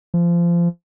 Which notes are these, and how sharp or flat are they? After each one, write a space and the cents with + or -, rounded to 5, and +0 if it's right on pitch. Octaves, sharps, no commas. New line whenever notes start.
F3 -25